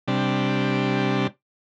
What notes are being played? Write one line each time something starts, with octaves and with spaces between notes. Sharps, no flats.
C3 G3 D4